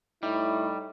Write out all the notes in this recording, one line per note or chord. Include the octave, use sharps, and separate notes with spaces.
A2 G3 D#4 E4